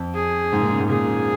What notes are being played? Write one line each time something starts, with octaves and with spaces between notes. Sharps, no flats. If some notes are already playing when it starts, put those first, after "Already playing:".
Already playing: F2
G#4
G#2
A#2
C#3
G#2
A#2 G#4